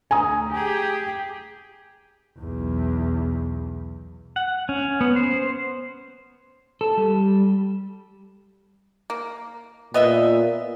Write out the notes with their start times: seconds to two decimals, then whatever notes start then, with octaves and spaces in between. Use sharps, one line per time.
0.11 D2 G#5 A#5 D#6
0.52 G4 G#4
2.39 B1 E2
4.36 F#5
4.69 C#4
5.01 B3
5.16 C5
6.81 A4
6.98 G3
9.10 A#3
9.94 A#2 B3 D#5 E5